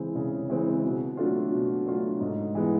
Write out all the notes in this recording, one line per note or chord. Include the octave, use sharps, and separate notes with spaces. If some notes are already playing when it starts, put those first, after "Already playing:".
Already playing: C#3 E3 G#3 C4
C#3
E3 G#3 C4
B2
F#3 A3 D4 F4
B2
F#3 A3 D4 F4
G#2
E3 G#3 B3